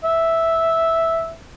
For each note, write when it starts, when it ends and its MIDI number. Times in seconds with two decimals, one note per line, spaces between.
0.04 1.31 76